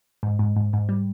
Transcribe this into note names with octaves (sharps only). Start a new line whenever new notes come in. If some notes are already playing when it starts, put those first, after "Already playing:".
G#2
G#2
G#2
G#2
G3